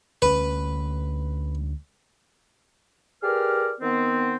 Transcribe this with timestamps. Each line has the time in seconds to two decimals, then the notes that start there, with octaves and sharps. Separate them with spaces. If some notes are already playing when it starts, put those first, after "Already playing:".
0.22 D2 C#4 B4
3.23 G4 G#4 A#4 B4 D5 F6
3.81 D#3 B3 C4